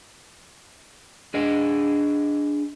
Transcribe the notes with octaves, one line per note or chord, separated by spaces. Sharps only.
D4 G#4 D#5